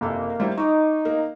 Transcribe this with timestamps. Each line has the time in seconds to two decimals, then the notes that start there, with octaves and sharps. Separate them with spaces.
0.01 F#1 C3 A#3 A4
0.40 G3 E4 C5
0.58 D#4 C#6 D6
1.05 A#3